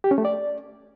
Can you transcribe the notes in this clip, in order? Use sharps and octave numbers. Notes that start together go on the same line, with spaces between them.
G4
C#4
A3
D5